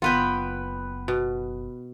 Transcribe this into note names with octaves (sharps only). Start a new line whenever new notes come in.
F#1 B3 F4 B4 G5
B2